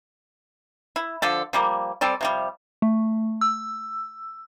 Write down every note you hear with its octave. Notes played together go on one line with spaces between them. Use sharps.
E4
D3 F3 A4
F3 G3 A#3
G3 C4 A4 D5
C3 F3 G3
A3
E6